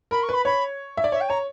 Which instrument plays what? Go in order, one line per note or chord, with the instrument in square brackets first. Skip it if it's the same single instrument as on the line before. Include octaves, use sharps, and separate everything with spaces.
[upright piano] A#4 [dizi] B5
[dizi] C#6
[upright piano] B4 [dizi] B5
[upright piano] C#5 [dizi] B5
[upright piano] E5
D5
[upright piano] C#5 [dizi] E5
[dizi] G5
[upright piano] C#5 [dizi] A#5